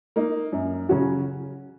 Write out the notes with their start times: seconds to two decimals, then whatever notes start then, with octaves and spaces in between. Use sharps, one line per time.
0.16 A#3 D#4
0.52 F#2
0.89 C#3 F#3 C#4 F#4